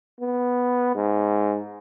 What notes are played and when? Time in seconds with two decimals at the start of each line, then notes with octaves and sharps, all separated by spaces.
0.21 B3
0.95 G#2